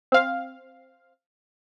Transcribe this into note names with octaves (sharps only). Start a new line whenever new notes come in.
C4 F5